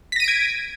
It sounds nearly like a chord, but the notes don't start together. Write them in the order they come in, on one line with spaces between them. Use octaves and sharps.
B6 A#6 D#7 D7 G#6